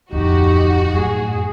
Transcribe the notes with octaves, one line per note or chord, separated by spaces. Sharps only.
D1 F2 D#4 F#4 G4
F#2 A2 G#4